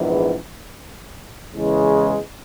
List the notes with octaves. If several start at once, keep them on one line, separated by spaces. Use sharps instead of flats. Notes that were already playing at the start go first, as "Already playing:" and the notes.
Already playing: A#1 G#2 E3 B3
E2 C#3 E3 G#3